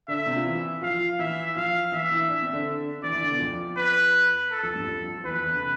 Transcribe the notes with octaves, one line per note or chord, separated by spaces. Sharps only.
D3 D4 E5
C3 C4
F4
E3 E4
F3 F4 F5
E3 E4 E5
F3 F4 F5
E3 E4 E5
E3 E4
D4
C4
D3 D4
E3 E4 D5
E3 E4
D3 D4
B2 B3
F2 F3
B4
A4
F2 F3
G2 G3
F2 F3
F3
E2 E3 B4
E2 E3
D3
C3